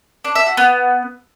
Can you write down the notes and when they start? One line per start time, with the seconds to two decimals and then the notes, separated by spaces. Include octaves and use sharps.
0.24 D4
0.35 E5
0.46 F#4
0.57 B3